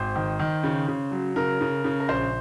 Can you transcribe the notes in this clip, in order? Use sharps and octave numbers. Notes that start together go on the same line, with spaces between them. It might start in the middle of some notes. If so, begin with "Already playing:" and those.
Already playing: G#1 C5
D#3
D#3
C#3
C#3
F#3
C#3 A#4
C#3
C#3
A#4
A#1 C5